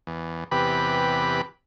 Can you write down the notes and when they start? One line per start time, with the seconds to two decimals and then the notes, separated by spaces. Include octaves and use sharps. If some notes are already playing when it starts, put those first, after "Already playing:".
0.07 E2
0.51 E2 C3 G4 B4 B5